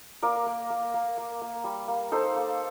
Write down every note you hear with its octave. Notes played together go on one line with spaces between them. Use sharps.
A#3 A#4 D5
A#3
A#3
A#3
A#3
A#3
G3
A#3
D#4 A4 C5
A#3